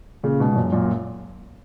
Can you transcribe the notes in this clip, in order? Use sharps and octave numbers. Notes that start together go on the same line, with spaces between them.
A#2 C#3
G#2 B2
F#2 A#2
F#2 A#2